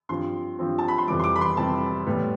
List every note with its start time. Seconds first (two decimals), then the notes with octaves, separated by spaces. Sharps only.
0.09 G2 F3 C4 C6
0.59 G2 F3 C4
0.78 A5
0.88 B5
0.98 C6
1.08 F2 C3 E3 G3 D6
1.20 C6
1.24 D6
1.36 B5
1.41 C6
1.57 F2 C3 E3 G3 A5
2.06 A2 G3 B3